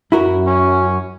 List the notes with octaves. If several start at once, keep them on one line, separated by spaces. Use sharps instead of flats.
F#2 E4 F#4 A#4
C#4